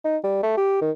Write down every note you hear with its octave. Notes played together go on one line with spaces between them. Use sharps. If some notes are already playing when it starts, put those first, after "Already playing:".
D#4
G3
A3
G4
D#3